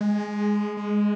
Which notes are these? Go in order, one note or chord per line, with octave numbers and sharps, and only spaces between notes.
G#3
G#3